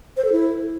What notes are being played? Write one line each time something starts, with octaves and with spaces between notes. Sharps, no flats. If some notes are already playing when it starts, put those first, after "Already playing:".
C5
A4
E4